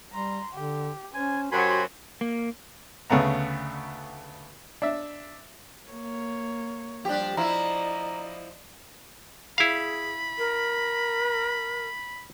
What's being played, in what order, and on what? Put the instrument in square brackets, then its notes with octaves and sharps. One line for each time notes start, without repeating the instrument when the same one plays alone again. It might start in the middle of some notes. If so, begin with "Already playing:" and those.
[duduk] G3 [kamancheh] A#5 C6
[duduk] D3 [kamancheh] G4
[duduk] C#4 [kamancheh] C5 [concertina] G#5
[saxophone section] F#2 F#3 [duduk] F#4 [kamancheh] G4 C5 [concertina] G#5 B5 C6
[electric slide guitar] A#3
[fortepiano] D2 C#3 A3 B3 A#5
D4 E5
[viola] A#3 C#5
[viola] F3 G3 [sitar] D4 G4
[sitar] F3 E4 [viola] D5 D#5 [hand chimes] A#5
[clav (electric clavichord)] E4 F5 [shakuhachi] G#4 [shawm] B5
[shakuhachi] A#4